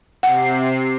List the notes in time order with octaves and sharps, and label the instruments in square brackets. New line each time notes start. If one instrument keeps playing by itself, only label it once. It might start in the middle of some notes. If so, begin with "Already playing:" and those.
[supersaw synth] C3 C7 [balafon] F#5